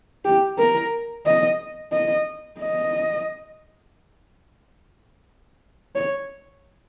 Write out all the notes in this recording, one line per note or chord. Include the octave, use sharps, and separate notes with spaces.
G4
A#4
D#5
D#5
D#5
C#5